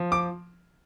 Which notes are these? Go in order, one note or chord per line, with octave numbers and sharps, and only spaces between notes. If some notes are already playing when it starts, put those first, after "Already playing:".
Already playing: F3
D6